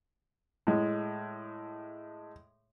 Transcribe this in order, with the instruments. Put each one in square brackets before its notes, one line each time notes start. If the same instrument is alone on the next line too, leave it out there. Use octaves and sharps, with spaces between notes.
[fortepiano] A2 G#3